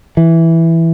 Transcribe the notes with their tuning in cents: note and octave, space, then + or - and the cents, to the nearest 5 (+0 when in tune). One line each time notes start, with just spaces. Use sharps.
E3 +0